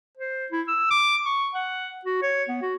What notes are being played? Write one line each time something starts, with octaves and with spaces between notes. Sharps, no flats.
C5
E4
E6
D6
C#6
F#5
F#4
C#5
B3
F#4